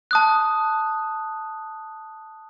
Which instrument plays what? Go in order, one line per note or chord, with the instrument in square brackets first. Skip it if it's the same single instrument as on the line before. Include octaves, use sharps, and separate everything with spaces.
[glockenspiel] A5 D#6 F#6